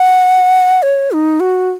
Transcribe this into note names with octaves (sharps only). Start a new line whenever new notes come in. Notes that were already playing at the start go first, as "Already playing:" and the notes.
Already playing: F#5
C#5
D#4
F#4